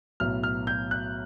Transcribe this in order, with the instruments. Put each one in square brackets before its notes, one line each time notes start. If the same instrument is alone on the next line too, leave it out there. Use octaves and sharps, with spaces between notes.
[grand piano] B1 A2 F#3 B3 F6
F6
G6
F#6